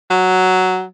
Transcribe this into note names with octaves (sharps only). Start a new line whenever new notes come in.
F#3